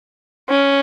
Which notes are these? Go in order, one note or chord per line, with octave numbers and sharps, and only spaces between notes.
C#4